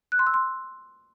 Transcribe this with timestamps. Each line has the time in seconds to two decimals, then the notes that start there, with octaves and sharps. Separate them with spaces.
0.12 F#6
0.19 C6
0.27 E6
0.34 C6